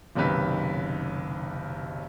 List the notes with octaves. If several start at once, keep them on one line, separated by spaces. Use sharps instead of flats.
F#1 B1 C3 D#3 B4 B6